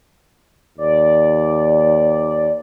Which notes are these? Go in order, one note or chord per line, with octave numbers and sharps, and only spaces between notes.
D#2 D5